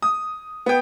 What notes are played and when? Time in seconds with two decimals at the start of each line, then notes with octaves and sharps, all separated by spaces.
0.02 D#6
0.66 B3 G5